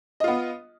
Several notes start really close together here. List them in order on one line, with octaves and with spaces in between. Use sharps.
D#5 F4 B3